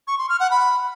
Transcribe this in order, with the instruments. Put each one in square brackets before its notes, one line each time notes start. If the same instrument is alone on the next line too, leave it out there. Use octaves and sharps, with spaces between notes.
[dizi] C#6
C6
F6
F#5
B5